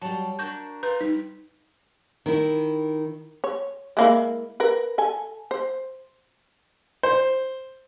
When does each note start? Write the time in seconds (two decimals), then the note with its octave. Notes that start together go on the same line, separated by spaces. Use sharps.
0.02 F#3 G3 A5
0.39 D4 F#4 A#4 G6
0.83 F4 B4 A#5 G6
1.01 G3 D#4
2.26 D#3 E4
3.44 C#5
3.97 G#3 A#3 E4
4.60 A#4 B4
4.98 A4 G#5
5.51 C5
7.03 C5